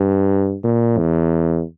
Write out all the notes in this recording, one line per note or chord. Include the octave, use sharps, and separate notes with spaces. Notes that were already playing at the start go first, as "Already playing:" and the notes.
Already playing: G2
A#2
E2